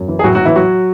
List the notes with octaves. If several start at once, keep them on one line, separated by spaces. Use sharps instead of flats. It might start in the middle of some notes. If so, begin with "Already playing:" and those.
Already playing: F#2
E3
G#4
A2 F#3 F#4
A2 F#3 F#4
E3 E4
F#3 F#4